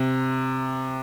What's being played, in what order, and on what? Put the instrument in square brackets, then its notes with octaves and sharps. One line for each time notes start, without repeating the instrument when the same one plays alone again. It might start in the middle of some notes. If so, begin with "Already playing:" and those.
Already playing: [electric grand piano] C3